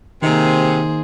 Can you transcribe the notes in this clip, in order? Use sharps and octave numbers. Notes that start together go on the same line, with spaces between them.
C3 D#3 A#3 D#4 G#4 C5